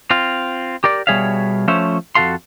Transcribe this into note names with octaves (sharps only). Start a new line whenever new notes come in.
C4 F4
G4 A#4 D5
B2 G3 G#4 C#5 E5 F5
F3 A3 C#4 C5 C#5 E5
F2 E3 F#4 A4 F5 C6